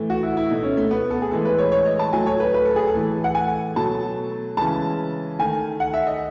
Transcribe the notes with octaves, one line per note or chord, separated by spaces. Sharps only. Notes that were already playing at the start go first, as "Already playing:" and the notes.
Already playing: A2 E3 A3
F#4
E4
E4
B2 A3 D#4
C#4
A3
B3
A4
G#4
A2 E3 G#3 A4
B4
C#5
C#5
D#5
A5
A2 F#3 A3 G#5
C#5
B4
B4
A4
G#4
A4
A2 E3 A3
F#5
G#5
B2 F#3 A3 A5
C#3 E3 G#3 A5
D#3 A3 G#5
F#5
E5
D#5